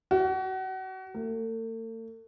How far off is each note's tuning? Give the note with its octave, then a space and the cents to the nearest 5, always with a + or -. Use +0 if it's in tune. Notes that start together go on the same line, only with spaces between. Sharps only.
F#4 +30
A3 +45